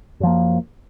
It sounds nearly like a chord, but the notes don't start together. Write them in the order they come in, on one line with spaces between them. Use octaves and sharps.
F#2 F3 A#3